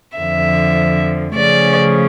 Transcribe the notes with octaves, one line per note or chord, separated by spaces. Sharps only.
F2 D3 F3 E5
C#3 F3 A3 C#4 D5